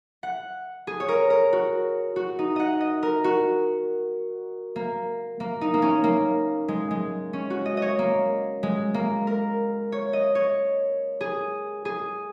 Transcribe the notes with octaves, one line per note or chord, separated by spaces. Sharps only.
F#5
G#4
C#5
A#4
A#4
F#4
F#4
D#4
D#5 F#5
D#5
A#4
F#4
A#3
A#3
D#4
A#3
C#4
A#3
G#3
G#3
C#4
F#4
D#5
C#5 D#5
A#3
G#3
A#3
A#4
C#5
D#5
C#5
G#4
G#4